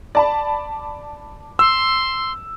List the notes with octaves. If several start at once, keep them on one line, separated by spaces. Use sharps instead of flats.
D5 A5 B5
C6 E6